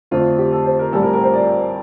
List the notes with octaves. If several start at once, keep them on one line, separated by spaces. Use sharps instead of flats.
F2 D3 A3 C4 F4
G4
A4
C5
A#4
A#1 A2 G3 C4 A4
A#4
A#4
C5
D5